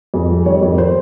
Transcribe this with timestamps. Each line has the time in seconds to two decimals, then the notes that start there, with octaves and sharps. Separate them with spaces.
0.14 F2 G#4
0.30 G3
0.46 D#3 C#5
0.62 F2
0.78 C5